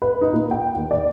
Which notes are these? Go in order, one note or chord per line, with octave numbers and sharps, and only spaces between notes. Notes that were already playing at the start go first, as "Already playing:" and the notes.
B4
D#4
A#2
G5
D#2
D5